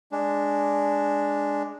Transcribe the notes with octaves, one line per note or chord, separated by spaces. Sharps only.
G#3 D4